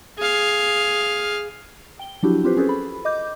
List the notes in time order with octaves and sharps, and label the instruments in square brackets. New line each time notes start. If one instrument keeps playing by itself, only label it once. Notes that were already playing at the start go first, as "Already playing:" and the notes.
[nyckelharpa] G#4 F5
[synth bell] G5 G7
F3 F#3 D4 E4 F#4 G4
C4 F4 G4 B4 C5
C#4 G#4 A4 B4 C5
A4 B5
D#5 D6 G6